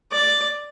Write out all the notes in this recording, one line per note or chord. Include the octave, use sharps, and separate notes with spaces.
D5